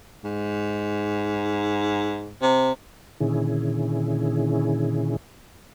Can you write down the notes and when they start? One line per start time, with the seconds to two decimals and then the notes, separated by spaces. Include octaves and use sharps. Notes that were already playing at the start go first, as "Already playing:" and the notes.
0.24 G#2
2.42 C3
3.20 A#2 D3 D#3 C#4 E4 G#4